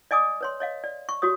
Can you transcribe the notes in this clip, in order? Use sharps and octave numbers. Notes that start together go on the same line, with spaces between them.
D5 D#5 G#5 D6 D#6
B4 C#5 C6
C#5 D#5 F5
D5
C#6
F#4 G4 C#5 D#6